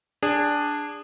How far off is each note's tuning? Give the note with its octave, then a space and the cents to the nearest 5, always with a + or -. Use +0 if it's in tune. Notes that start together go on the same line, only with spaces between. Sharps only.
D4 +0 G#4 -20